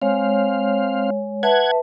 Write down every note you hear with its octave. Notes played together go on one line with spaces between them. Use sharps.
G#3 C4 C#5 F5
B4 E5 F#5 A5 G#6